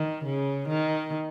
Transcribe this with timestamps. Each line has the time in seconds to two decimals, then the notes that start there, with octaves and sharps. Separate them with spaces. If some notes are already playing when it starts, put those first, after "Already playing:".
Already playing: D#3
0.25 C#3
0.68 D#3